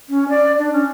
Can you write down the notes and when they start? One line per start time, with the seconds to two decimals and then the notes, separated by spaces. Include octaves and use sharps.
0.09 C#4
0.29 D5
0.58 D4
0.73 C#4